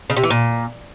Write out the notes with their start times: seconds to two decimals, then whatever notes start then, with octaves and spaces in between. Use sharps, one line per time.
0.10 C#3
0.17 C3
0.23 E3
0.30 A#2